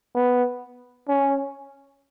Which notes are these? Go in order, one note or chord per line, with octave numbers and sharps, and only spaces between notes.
B3
C#4